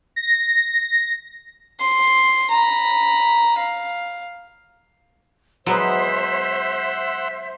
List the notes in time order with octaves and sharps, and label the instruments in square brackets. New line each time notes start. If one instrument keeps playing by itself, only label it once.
[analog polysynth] A#6
[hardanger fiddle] C6
A#5 B5
F5
[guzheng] F#3 G#3 B3 [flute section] C5 E5 [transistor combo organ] F#5 C6 E6